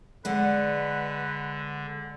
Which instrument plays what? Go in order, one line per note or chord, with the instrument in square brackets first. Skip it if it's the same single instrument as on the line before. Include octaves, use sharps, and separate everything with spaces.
[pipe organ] D3 [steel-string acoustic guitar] G#3 D5 F#5 [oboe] B4